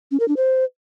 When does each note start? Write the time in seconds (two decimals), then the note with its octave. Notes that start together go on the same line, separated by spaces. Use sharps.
0.11 C#4
0.20 A#4
0.28 D4
0.37 C5